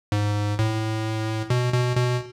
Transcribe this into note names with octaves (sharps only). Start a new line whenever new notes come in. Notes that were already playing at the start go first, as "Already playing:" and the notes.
G#2
A2
B2
B2
B2